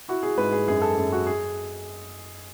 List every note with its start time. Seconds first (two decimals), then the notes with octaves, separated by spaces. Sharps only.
0.09 E4 F#4
0.23 G#4
0.38 G#2 B4
0.52 G#4
0.68 F#2 G#4
0.82 A4
0.97 F#2 G#4
1.12 F#4
1.27 G#4